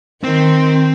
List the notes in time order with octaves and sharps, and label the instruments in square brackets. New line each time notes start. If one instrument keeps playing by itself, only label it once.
[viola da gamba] D#3 [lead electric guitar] C4